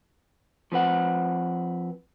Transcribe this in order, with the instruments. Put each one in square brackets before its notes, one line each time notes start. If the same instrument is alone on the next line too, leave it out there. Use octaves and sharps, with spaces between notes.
[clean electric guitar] F3 C4 B4 F#5